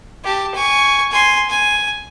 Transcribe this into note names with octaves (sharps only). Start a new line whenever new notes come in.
G4 A5
G#5 C#6
G#5 C6
G#5